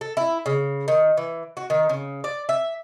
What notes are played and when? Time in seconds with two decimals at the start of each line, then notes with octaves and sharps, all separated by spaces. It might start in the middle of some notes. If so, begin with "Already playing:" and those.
0.01 A4
0.17 E4
0.46 C#3
0.88 D#3
1.17 E3
1.57 F#4
1.70 D#3
1.89 C#3
2.24 D5
2.49 E5